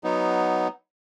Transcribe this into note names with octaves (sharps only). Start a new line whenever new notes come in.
F#3 B3 D#4